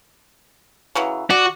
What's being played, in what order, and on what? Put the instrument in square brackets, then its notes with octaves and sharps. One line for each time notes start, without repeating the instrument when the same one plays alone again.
[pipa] C#3 E3 F#3
[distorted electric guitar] F#4 [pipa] D5